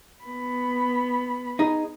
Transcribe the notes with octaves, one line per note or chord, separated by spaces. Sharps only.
B3 B5
D#4 G#4